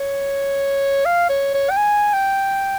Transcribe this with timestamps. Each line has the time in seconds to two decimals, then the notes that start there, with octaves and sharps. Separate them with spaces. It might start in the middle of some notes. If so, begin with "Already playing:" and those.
Already playing: C#5
1.05 F5
1.29 C#5
1.54 C#5
1.70 G5
1.77 G#5
2.13 G5